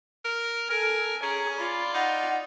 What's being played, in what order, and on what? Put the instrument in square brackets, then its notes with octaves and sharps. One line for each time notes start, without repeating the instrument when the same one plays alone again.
[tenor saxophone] A#4
[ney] A4 [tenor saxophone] A#4 [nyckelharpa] G#5
[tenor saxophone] C#4 [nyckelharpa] G#4 [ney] A#5
[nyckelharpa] F4 D5 [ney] B5
[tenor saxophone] D#4 [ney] F#5